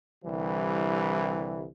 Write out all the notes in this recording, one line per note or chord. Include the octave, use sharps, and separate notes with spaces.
C2 D3 E3 G3